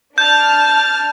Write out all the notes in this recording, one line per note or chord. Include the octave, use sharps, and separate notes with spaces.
D4 A5 F6 G6